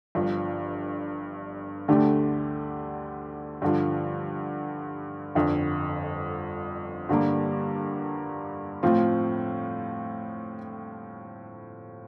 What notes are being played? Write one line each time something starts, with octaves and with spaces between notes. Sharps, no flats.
G1 G2 F3
D2 D3 A3 D4 G4
G2 D3 F3
G1 F2 D3
G2 D3 G3 A#3
A2 F3 C4 F4